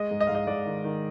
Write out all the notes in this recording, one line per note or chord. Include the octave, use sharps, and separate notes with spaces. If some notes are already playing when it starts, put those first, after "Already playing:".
Already playing: G#3 D#5
G#2
D#5
G#2 F5
D#5
G#2 D5
D#3
D#3